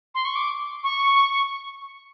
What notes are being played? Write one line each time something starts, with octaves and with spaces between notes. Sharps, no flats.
C6
C#6
D6
C#6